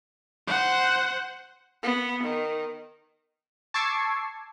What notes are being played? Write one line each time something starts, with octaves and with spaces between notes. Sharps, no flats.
C5 F#5
B3
D#3
A5 C#6 D6 E6 G#6 C7